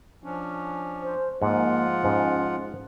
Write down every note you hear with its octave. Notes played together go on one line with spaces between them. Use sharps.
F3 C#4 D4
C5
G#2 F3 A#3 F4 F#5
G#2 C#4